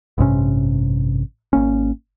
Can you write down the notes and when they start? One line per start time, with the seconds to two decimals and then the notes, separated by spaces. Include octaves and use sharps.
0.18 A1 G2 C3 C#4
1.53 G#1 A#3 C#4